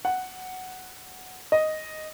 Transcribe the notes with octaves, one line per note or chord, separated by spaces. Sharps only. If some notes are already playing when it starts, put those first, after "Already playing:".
F#5
D#5